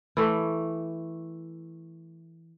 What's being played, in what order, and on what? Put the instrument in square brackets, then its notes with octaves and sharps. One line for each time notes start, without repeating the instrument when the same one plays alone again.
[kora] E3 A3